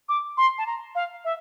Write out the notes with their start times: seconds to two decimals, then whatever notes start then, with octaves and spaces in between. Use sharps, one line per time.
0.09 D6
0.37 C6
0.58 A5
0.67 A#5
0.95 F5
1.25 E5